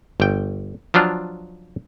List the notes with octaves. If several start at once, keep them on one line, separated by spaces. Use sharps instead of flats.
G1 G5
F3 F#3 D4 F4